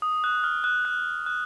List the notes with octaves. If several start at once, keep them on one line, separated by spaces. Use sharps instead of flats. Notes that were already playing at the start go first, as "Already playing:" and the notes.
D#6
F#6
F6
F#6
F#6
F#6